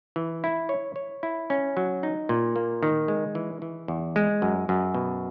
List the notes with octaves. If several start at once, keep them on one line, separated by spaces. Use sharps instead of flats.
E3
E4
C#5
C#5
E4
C#4
F#3
D#4
A#2
A#3
D#3
G#3
E3
E3
E2
G#3
F#2
F#2
B2